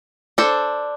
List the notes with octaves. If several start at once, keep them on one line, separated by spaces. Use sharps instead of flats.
D4 A4 C5